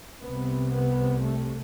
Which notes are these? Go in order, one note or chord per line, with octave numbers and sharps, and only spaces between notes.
C2 C3 B3
B3
A3